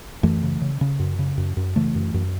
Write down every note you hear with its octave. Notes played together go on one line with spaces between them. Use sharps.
F#2 E3 A3
C#3
C#3
C#3
F#2
C#3
F#2
F#2
C#3 E3 A3
F#2
F#2